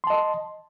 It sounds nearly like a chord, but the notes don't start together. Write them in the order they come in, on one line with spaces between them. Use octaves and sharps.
C6 A5 D#5